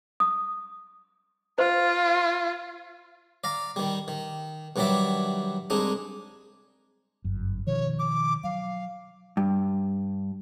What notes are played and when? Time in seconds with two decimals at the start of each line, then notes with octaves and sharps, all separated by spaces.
0.20 D#6
1.58 F4 C5
3.44 D5 F5 A#5
3.76 D#3 G3
4.08 D#3
4.76 G2 D#3 F#3 G3 D5 E5
5.70 C2 G#3 D4 D#4
7.24 G1 F#2
7.67 B2 D#3 F3 C#5
7.99 D6
8.44 F#3 F5
9.37 G2